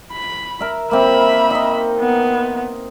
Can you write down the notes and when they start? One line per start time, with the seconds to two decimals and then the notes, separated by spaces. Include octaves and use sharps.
0.13 B5
0.61 A#4 E5
0.91 A#3 C4 E5 B5
1.50 D#4 D#5
1.99 B3